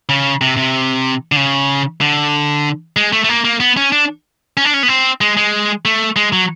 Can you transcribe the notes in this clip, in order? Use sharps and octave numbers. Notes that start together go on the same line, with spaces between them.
C#3
C3
C3
D3
C#3
D3
G#3
A3
A3
A#3
A#3
B3
C#4
D4
C#4
D4
C#4
B3
C4
G#3
G#3
A3
G#3
F#3